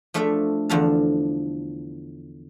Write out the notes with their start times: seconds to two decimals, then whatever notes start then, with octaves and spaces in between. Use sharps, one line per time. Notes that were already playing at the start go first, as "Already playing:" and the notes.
0.14 F3 A3 D4 A4 E5 F5
0.69 E2 D3 F3 F5 A5